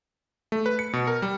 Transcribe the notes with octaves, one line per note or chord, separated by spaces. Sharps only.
A3
B4
C#7
B2
A#4
G3